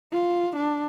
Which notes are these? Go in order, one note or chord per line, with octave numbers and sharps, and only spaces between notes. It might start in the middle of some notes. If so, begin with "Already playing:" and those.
F4
D4